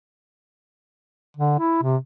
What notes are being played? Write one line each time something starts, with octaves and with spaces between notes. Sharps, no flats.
D3
E4
C3